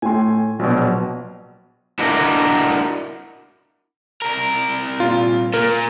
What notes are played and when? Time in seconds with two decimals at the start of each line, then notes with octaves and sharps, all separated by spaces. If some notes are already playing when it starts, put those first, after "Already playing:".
0.02 A2 G5 G#5 C6
0.59 A#1 B2 F#3
1.99 D4 E4 F#4 A#4 D#5 F5
4.22 C2 A#4
5.00 A#2 F4
5.54 A#2 A#3 A#4